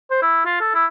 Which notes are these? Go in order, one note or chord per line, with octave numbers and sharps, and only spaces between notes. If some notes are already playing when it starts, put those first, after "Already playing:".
C5
E4
F4
A4
E4